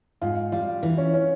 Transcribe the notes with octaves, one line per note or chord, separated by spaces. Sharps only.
G#2 F4
G3 F4
E3
C#4
C#4